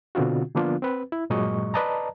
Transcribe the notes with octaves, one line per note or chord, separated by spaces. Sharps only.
B2 D3 C4 F4 F#4
D3 F3 A#3 B3 D4 F4
C4 B4
E4
G2 A#2 F#3 G#3 D#5 C#6
B4 D5 D#5 A5 A#5